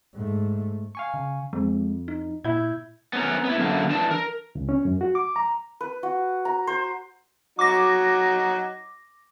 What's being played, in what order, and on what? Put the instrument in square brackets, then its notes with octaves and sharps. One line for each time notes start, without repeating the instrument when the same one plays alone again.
[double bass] G#2 A3
[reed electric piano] F5 G#5 C#6
[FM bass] C#3
[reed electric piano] F2 [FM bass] G#3
[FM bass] D#4
[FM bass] A#2 [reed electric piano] E4 G6 G#6
[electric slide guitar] B3 C#4 A#4
B3 E4
F#2 D3 A#3
E3 D4 D5 A5
A#4
[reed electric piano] C#2
C#4
F#2
F#4
D6
A#5
[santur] B4
F#4
A#5
C5
[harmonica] F#3 D#4 F#4 [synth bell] D6 A#6